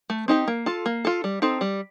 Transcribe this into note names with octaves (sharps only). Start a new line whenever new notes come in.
A3
C4 D#4 G4
A#3
F4 A4
A#3
F4 A4
G3
C4 D#4 A4
G3